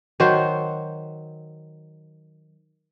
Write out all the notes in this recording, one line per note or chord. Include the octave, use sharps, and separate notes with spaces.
D#3 F#3 F#4 C5